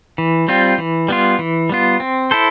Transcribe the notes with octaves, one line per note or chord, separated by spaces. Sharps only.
E3
G3 C4 F4
E3
G3 B3 F4
E3
G3 B3 F4
C4
E4 A4 C5